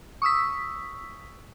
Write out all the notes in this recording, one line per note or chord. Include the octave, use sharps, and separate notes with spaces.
C#6 D#6 E6 B6